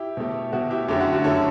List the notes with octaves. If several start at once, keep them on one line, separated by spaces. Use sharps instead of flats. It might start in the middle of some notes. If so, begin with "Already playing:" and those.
Already playing: E4 G4
B2 A3
B2 A3 F#4
E4 G4
F#2 D3 A3 E4 G4
F#4
F#4
F#2 D3 A3 A4 C#5